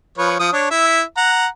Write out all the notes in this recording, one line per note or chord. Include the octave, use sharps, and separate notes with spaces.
F3 B4 C#5
F3 D#6
D4 C#5
E4 E5
F#5 A#5